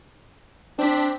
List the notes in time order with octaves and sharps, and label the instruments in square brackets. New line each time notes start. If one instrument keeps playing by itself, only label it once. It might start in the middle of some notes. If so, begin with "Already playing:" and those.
[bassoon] C4 [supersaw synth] D4 B6